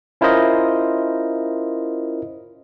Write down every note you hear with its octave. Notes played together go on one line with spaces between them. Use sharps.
C#4 E4 F4 A#4 C5 D#5